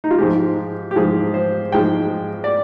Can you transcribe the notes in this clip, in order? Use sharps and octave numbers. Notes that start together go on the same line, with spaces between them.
D#4
F4
G#2 F3 G#3 G4
G4
G#2 F3 G#3 G#4
C5
G#2 F3 G#3 G5
D5